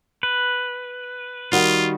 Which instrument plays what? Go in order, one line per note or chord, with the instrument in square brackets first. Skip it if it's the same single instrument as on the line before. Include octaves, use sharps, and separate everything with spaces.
[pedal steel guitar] B4
[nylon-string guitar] D#3 G3 F#4 [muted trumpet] F4